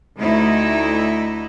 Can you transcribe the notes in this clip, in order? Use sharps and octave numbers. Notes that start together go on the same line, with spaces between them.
D2 A3 D#4 E4